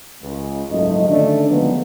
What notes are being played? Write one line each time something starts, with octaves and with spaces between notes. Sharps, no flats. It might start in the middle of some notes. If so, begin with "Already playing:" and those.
C#2
F#1 G#2 F3 F#3 A3 D#5
D3 D#3 A3 C#4 D4
C#2 F3 F#3 G#3 A#3 B3